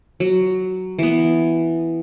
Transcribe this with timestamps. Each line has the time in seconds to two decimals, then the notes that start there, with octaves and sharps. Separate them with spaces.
0.20 F#3
0.99 E3 B3